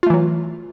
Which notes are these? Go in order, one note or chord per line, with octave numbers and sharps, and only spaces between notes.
E3 F#3 A3 F4